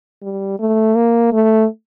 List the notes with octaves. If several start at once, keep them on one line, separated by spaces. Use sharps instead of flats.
G3
A3
A#3
A3